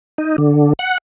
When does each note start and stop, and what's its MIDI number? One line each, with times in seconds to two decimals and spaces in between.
0.18 0.36 63
0.38 0.73 50
0.79 0.98 78